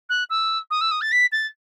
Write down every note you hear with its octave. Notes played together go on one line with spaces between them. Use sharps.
F#6
E6
D#6
E6
D#6
A6
B6
A6